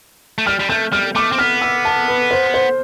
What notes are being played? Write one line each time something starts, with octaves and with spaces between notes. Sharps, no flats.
A3
G3 F6
G3
A3 G6
G3 F6
A3 D6
C4
B3 F6
E6
A5
B4
C5
C5